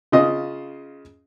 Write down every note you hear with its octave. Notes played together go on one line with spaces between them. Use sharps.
C#3 F4 D#5 D#6